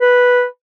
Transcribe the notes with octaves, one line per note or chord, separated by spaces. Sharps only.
B4